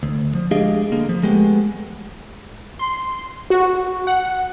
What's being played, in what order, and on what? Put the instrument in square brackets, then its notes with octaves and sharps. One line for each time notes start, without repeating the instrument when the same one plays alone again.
[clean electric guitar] D2
F3
G#3 D4 G4 G#4 D#5 F5
D3 A#3
F3
G#3 A3 B3 G4
[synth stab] C6
F#4
F#5